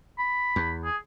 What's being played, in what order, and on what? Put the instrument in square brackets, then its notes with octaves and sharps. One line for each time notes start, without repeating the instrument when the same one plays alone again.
[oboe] B5
[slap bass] E2
[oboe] G#4